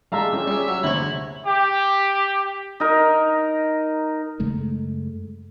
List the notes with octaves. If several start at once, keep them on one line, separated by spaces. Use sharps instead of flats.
G3 G#3 E5 F5 A5 A#5
G3 C#4 F4
G3 C#4 G#4
F#3
D2 C3 E4 C#5 F#7
G4
D#4 A#4
F#2 C#3 G#3 A3